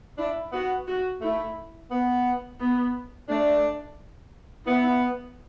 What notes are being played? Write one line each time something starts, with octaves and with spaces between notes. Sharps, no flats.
D4 E4
B3 F#4
F#4
A3 E4
B3
B3
A3 D4
B3 E4